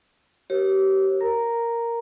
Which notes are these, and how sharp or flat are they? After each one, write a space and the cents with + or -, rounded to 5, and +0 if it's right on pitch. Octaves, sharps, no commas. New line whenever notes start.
G4 -30 A#4 +30 C#5 -40
A#4 +0 A#5 +0